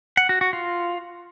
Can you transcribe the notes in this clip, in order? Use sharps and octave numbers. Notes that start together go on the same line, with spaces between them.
F#5
F#4
F#4
F4